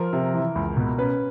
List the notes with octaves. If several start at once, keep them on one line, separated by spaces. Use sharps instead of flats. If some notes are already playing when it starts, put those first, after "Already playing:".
Already playing: F3 A#4
C3
E3
C#2
B2
C#4 B4